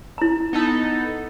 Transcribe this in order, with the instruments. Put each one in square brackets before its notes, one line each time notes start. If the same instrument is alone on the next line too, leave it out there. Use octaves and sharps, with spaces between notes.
[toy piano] E4 A#5
[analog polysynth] B3 D#4 A4